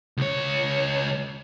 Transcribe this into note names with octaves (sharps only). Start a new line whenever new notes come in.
C#2 C#5